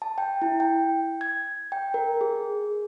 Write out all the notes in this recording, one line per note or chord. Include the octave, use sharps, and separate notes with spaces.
A5
G5
E4
G5
G#6
G5
A#4
G#4